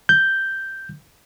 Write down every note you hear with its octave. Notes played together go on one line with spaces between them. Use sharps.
G6